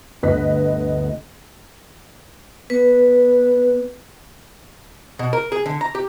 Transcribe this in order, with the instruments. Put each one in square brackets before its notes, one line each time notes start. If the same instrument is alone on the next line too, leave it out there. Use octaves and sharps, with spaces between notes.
[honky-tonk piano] G1 D2 B4 D#5 F#6 B6
[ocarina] B3 [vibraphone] B4
[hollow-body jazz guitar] B2
A#4
G#4
D3
A#5
G4